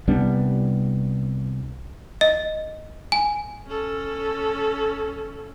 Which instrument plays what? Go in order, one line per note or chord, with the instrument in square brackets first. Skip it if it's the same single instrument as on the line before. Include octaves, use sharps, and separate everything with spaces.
[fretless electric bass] C2 G3 B3 D4
[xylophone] D#5
G#5
[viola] C#4 A4